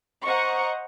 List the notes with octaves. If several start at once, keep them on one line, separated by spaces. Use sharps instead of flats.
C5 D#5 F#5 A#5 C#6